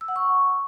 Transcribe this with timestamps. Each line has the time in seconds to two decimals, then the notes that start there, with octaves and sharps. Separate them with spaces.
0.01 E6
0.08 F#5
0.16 C#6